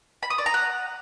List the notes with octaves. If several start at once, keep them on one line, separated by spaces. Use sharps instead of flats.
B5
D#6
D5
A#5
F#5